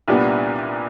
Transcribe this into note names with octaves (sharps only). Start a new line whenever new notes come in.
C2 A#2 G3 B3 D4